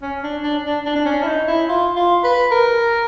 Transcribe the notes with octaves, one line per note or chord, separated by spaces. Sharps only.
C#4
D4
D4
D4
D4
D4
C#4
E4
D#4
E4
F4
F4
B4
A#4